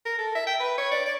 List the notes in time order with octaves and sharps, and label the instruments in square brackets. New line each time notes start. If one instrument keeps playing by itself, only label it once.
[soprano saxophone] A#4
A4
E5
G5
B4
C#5
D5
D5